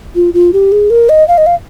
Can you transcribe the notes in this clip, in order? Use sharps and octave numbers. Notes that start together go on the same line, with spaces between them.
F4
F4
G4
G#4
A#4
D#5
F5
D#5
F5